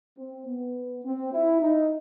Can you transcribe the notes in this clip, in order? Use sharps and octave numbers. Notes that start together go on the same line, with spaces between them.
C4
B3
C4
E4
D#4